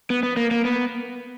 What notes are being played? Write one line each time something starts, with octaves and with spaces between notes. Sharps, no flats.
B3
B3
A#3
A#3
B3